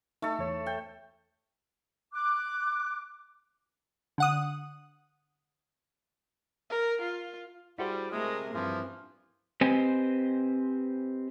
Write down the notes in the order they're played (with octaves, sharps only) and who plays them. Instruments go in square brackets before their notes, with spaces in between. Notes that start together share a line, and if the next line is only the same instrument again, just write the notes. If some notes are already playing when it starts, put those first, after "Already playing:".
[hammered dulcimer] A3 A4 [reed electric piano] D#4
[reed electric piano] E2 C#5
[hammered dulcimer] G5
[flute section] D6 F#6
[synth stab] D3 F#5 D#6
[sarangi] A#4
F4
[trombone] G3 [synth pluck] E4 F#4 C5 [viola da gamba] G#4
[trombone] C3 [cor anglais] G#3 [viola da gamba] A3 G#4 A#4
[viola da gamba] G2 C4 [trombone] E3 [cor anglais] F3
[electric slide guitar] C4 G4 B4 C5 D#5 G#5